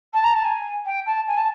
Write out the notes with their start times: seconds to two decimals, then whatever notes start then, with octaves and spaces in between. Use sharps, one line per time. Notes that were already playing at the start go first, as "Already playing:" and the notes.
0.13 A5
0.24 A#5
0.34 A5
0.44 G#5
0.85 G5
1.06 A5
1.27 G#5
1.37 A5